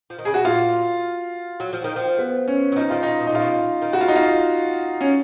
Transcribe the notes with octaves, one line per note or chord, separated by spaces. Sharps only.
F3
D#3
C#3 G#4
B2 F#4
A#2 F4
F#3
F3
D#3
F3
B3
C#4
F#3
F3 D#4
D#3 F4
B2 D#4
B2
A#2 D#4
B2 F4
D#3
C#3 F#4
F4
D#4
F4
C#4